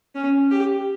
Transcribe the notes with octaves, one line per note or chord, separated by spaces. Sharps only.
C#4
G4